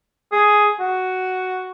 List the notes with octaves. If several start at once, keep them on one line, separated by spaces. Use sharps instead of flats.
G#4
F#4